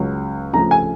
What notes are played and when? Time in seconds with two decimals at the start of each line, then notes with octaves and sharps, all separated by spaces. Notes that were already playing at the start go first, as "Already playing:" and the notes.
Already playing: C#2 C#3 F#3
0.53 D2 C#3 F3 A3 A#5
0.71 G#5